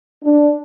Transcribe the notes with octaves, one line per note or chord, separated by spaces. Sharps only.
D4